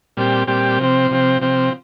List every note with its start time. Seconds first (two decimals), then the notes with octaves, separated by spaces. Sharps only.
0.17 A#2 G3 C4 G4
0.47 A#2 G3 C4 G4
0.79 C3 F3 C4
1.11 C3 F3 C4
1.41 C3 F3 C4